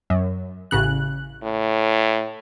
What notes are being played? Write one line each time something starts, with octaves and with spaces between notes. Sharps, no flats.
F#2
A1 C#3 F#6
A2